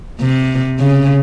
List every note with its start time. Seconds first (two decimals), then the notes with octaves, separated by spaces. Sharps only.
0.20 C3
0.79 C#3